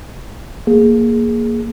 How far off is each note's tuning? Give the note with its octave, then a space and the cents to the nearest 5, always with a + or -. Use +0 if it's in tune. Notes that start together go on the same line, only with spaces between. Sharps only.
A#3 +0 G#4 +0